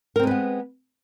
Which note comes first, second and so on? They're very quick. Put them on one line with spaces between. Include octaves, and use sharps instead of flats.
A#4 C4 G#3 B4 B3